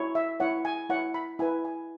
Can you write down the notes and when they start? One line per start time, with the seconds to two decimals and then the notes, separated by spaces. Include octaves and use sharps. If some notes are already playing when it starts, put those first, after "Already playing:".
Already playing: E4 C#5
0.15 E5
0.40 E4 C#5 F#5
0.65 G#5
0.89 E4 C#5 F#5
1.14 B5
1.39 E4 B4 G#5
1.65 G#5